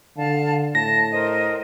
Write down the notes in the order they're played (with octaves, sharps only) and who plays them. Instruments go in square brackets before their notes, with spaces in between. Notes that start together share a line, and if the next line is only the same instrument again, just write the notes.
[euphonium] D3 [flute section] F5 A5
[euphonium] A2 [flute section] A5 [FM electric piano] A#6
[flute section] A#4 C5 D#5